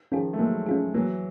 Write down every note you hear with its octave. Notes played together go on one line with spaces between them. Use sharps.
D#3 F3 C#4 F4 G#4
A3
F#3 G#3 A#3
C#4 F4 G#4
E3 F#3 A#3